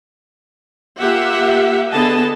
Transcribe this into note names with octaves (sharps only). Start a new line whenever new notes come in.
A#3 F4 G4 E5 F#5
D3 B3 G#4 D#5 A5